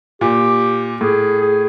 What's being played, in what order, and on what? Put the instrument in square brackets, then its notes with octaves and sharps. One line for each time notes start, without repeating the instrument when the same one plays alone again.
[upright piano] A#2 [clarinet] G4
[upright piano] A2 [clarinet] G#4
[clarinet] G#4